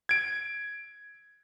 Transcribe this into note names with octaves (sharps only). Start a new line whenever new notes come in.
G#6 D7